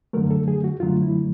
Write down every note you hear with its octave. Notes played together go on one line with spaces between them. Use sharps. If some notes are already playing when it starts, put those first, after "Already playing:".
F#2 D3 F#3 A3 A#4
A4
G#4
F#4
F#2 D3 F#3 A3 F4
E4